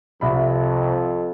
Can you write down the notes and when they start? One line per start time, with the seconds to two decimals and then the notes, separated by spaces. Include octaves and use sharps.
0.21 C2 F2 E5 B5